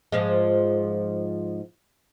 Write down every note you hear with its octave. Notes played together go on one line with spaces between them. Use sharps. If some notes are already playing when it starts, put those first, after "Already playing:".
G#2 F3 G#3